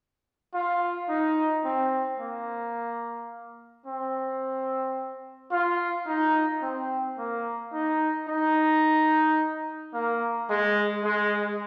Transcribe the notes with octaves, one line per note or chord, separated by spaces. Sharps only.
F4
D#4
C4
A#3
C4
F4
D#4
C4
A#3
D#4
D#4
A#3
G#3
G#3